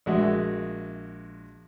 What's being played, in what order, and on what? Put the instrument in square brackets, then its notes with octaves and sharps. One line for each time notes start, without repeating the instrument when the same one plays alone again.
[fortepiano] A#1 G#3 F#4 E5